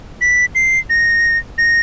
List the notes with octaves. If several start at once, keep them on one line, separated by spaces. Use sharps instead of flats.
B6
C7
A#6
A#6